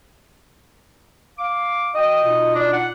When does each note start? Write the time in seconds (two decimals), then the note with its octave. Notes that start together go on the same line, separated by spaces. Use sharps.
1.39 F5 D6
1.95 F#4 D#5 G5 D#6
2.24 B2 D#4 F4
2.55 D4
2.73 F#5